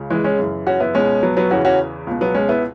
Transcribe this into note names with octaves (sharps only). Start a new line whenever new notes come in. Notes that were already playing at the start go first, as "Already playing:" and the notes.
Already playing: C#2 C#3
E3 G#3
G#3 C#4
F#2 C#3 E3
C#4 F#4
B3 E4
C#2 B2 G#3 C#4
F#3 B3
F#3 B3
E2 C#3 E3 C#4 F#4
C#4 F#4
C#2 B2
F#3 B3
G#3 C#4
B3 E4